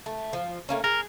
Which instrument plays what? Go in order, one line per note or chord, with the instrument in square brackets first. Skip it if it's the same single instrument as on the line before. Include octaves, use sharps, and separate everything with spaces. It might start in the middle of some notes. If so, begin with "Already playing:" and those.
[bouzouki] A3
F3
A3 A#3 C#4
[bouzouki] G#4 [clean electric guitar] A#4